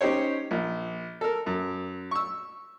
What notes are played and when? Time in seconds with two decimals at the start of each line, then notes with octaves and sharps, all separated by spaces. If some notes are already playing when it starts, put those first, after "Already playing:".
0.01 C#4 D#4 G4 C5 C#5
0.51 A#1
1.21 A4 A#4
1.46 F#2
2.11 C#6 E6